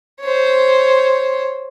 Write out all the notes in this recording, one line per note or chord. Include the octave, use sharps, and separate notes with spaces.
C5 C#5